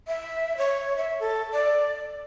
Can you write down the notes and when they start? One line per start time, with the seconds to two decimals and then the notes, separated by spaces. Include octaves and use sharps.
0.08 E5
0.58 C#5
0.97 E5
1.20 A4
1.52 D5